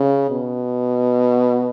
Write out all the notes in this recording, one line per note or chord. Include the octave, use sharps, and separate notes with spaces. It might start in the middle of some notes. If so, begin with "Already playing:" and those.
Already playing: C#3
B2